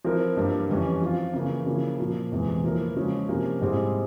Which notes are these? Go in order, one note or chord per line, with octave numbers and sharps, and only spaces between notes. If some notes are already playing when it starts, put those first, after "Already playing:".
F3 C4 E4 A#4
G2 G3 A#3 F4
F2 E3 G3 C#4
F3 C4 F4
C#3 E3 A#3
C#3 F3 A#3 E4
A#2 F3 A#3
E2 C3 E3 G#3
F3 A#3 E4 A#4
C#3 F3 G#3 C#4
C3 F3 A#3 C#4 G4
G#2 G3 C4 E4 G#4